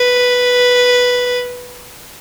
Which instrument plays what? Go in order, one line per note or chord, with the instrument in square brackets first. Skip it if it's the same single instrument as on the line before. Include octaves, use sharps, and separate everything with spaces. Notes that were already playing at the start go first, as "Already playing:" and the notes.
Already playing: [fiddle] B4